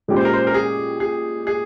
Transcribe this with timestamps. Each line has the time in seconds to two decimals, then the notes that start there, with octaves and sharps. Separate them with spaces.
0.08 A#2 G#3 C#4 G4
0.16 C5
0.25 A#4
0.33 C5
0.47 A#4
0.54 G#4
1.00 G#4
1.47 G#4